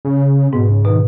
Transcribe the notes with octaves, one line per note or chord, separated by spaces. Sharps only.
C#3
G#2 B2
C#3
B2 D#3